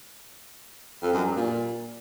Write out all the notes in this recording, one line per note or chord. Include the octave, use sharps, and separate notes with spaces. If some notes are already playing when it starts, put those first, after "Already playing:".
F2
F#2
G2
A#2